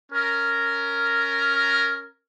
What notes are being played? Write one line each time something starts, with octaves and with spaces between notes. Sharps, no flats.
C#4 A#4